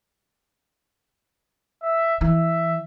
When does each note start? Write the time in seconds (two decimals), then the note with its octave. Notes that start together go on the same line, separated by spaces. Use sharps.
1.82 E5
2.21 E3 E5